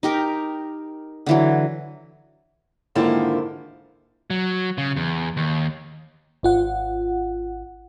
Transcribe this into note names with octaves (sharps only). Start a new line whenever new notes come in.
D#4 G4 A#4
D3 E3 F#3
G#2 D3 D#3 A#3 E4 F4
F#3
C#3
E2
D#2
G#1 F4 F#5